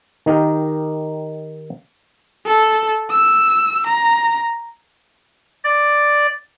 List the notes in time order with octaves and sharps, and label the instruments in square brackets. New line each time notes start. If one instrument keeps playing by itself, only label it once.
[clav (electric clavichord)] D#3 D#4 G4 A#4
[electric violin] A4
E6
A#5
[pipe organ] D5